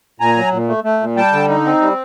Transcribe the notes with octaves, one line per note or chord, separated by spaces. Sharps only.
A#2 G#5 A#5
F#3
A#2
A3
A3
A#2
G3 G5 A5
D3
D#4
C4
G3